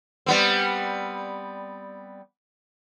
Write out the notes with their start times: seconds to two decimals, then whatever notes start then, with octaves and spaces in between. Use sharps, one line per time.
0.26 G3 B3 C4